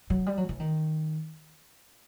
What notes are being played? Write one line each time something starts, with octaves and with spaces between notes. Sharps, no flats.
F#3
G3
F#3
E3
D#3